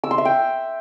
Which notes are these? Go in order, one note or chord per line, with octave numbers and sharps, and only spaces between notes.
E6
C6
E5
G5